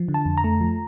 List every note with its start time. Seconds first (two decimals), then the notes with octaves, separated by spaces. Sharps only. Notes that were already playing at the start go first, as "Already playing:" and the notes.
Already playing: F3
0.08 D3
0.14 A5
0.26 F2
0.38 A#5
0.44 A3
0.61 F3